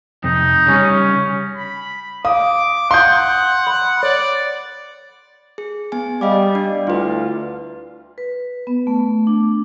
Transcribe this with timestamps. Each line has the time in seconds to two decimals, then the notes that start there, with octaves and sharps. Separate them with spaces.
0.24 F2 C3 D#4
0.67 C#3 G3 C#4
1.56 B5
2.25 F5 D6 D#6
2.91 F5 F#5 C6 D#6 G6
3.67 B5
4.03 C#5 D5
5.58 G#4
5.92 B3 G#5
6.21 G3 D#5 F5 D6
6.55 D4
6.87 D2 E4 F4 B4
8.18 B4
8.67 B3
8.87 A3
9.27 D4